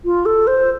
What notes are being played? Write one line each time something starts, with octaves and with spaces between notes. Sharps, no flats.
F4
A4
C5